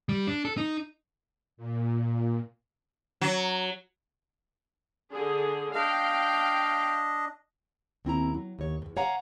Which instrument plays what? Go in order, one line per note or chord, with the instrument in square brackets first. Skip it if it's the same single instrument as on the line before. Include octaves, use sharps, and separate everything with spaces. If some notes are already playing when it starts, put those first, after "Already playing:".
[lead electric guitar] G3
D4
A4
D#4
[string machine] A#2
[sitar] F#3
[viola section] D3 G#4
[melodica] D4 D#5 [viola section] F5 G5
[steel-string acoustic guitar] D#2 C4 E4 A#5
F#3
D#2 C#5
E2 G2
C#5 F5 F#5 G#5 A#5